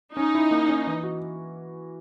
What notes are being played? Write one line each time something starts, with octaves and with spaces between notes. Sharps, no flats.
C#4 D#4
E4
A#3
C#4
E3
F#4